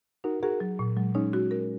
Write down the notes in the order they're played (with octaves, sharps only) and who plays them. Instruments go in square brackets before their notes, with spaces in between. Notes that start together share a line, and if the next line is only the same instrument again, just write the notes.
[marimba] D#4 [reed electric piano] F#4 A#4
[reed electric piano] F#4 A#4 [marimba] G#4
[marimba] F#3
A#2
[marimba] F#3 [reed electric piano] G#3
[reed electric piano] G#3 C#4 [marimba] D#4
[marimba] F#4
A#4